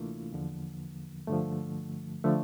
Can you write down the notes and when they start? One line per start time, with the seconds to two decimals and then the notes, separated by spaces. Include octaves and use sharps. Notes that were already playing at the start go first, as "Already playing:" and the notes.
Already playing: D2 C3 E3 A3 A#3 D4 E4 F4
0.32 E2 D3 F3
1.28 G2 D3 F3 A3
2.24 D3 F3 A3